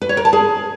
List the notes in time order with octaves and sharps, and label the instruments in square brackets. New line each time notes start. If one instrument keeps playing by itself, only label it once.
[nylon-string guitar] B4
C#5
A#4
A5
G#4